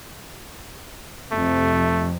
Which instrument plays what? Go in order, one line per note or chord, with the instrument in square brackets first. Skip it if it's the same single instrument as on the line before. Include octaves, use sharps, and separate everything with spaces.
[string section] F2 C3 [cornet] A3